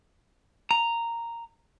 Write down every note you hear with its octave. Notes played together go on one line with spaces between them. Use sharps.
A#5